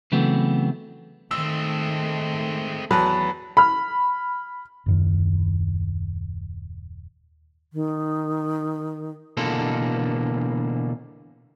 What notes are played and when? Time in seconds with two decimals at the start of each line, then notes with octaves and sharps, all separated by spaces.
0.12 C#3 E3 F#3 A3 B3 C4
1.31 D#3 G#3 A3 C4 E6
2.91 E2 F#3 B4 A5
3.57 B5 F6
4.86 D#1 F#2 D#3
7.73 D#3
9.37 B2 D3 E3 A#3 A4 C6